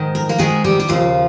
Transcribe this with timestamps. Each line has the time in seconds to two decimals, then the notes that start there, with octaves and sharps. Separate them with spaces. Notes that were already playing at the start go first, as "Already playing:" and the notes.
Already playing: G#2 D#3
0.15 A#4
0.29 A#3 A#4
0.38 G#2 D#3 G#3 G#4
0.64 G3 G4
0.80 G4
0.89 D#2 C#3 F3 F4